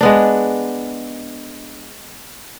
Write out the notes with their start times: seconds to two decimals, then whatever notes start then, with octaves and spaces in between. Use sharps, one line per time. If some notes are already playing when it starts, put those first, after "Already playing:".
0.01 G#3 B3 D4